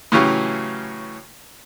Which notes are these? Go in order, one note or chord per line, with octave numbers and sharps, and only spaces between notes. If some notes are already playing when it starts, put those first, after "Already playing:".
A2 C#3 E3 F#3 C#4 G4